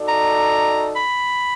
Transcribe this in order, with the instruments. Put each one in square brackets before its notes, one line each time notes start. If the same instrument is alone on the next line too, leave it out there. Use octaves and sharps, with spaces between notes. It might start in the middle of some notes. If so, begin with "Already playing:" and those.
Already playing: [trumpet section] D#4 F#4 A4 D5
[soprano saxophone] A#5
B5